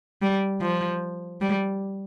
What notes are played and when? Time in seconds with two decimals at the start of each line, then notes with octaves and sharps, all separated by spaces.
0.22 G3
0.62 F3
1.41 G3